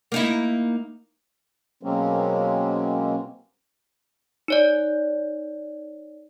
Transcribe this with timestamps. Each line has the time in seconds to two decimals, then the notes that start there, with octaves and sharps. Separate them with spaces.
0.12 A#3 D#4 E4
1.83 B2 F#3 G#3 A#3 C4 C#4
4.48 D#4 C#5 D5